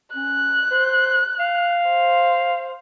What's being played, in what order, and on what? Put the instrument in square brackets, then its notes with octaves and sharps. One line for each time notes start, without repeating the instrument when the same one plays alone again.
[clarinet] C#4 [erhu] F#6
[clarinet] C5
F5
[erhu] C5